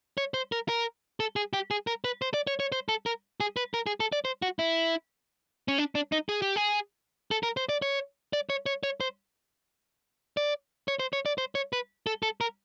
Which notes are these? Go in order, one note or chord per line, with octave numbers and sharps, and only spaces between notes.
C#5
C5
A#4
A#4
A4
G#4
G4
G#4
A#4
B4
C5
D5
C#5
C#5
C5
A4
A#4
G#4
B4
A#4
G#4
A4
D5
C5
F#4
E4
C#4
D4
D4
D#4
G#4
G4
G#4
A4
A#4
C5
D5
C#5
D5
C#5
C#5
C#5
C5
D5
C#5
C5
C#5
D5
C5
C#5
B4
A4
A4
A#4